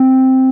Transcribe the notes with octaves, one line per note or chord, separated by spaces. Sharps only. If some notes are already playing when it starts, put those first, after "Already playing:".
Already playing: C4